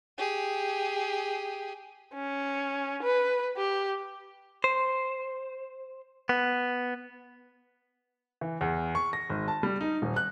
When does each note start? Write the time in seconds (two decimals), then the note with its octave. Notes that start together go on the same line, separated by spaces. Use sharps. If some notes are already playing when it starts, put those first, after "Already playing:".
0.18 G4 G#4
2.14 C#4
3.03 B4
3.57 G4
4.64 C5
6.29 B3
8.41 E3
8.61 E2
8.95 C#6
9.13 A#6
9.29 G#1
9.48 A5
9.63 G3
9.81 D#4
10.02 D#1
10.16 F#6